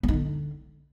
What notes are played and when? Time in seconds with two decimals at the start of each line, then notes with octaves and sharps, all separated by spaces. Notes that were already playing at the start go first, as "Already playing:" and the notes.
0.03 B3
0.08 D#4
0.13 D3